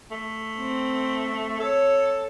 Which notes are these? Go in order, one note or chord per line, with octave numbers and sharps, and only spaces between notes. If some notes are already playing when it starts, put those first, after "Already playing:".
A3
C4
A4 C#5